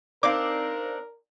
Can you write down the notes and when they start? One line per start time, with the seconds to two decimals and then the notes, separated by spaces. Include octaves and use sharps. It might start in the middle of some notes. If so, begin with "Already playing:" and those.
0.23 C4 D4 D#4 A#4 D5 F5 D6